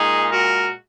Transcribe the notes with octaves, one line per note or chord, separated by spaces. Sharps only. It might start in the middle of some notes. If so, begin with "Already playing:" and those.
Already playing: A#2 G#3 D#4 G#4
F#4 A#4